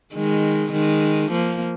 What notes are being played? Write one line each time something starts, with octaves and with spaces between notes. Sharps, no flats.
D#3 G#3
D#3 G#3
F3 A#3